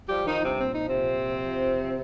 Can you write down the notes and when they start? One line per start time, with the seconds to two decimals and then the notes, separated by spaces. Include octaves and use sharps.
0.08 F3 G3 G4
0.25 D#3 F3 D#4
0.42 G2 C3 C4
0.59 A#2 C4
0.74 F3 D#4
0.87 C3 C4
0.93 A#2
1.10 A#2
1.28 F3
1.44 F3
1.61 F2
1.78 F3